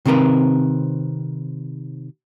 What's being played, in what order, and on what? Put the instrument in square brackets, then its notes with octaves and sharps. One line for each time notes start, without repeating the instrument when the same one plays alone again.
[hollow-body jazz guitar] C3 D#3 C4 A#4 B4